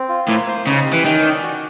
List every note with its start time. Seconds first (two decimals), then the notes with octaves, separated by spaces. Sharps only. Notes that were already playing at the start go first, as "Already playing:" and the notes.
Already playing: C4
0.09 F4
0.28 A2 A#3
0.47 C5
0.66 C#3 D#4
0.85 G4
0.93 E3
1.05 D#3 C#4
1.23 D5
1.43 F#4